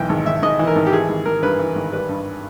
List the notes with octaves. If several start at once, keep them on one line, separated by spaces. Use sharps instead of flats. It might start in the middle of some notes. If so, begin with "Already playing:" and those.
Already playing: B1 E3 G5
G#1
G#1 E5
G#2 D#5
E3
A#4
G#1
G4
E3 G#4
G#1
G#1 A#4
G2 B4
E3
G#1
G3 B4
G2